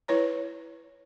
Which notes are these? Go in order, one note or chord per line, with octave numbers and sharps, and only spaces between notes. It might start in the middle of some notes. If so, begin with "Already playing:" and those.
E4 B4 C#5 A#5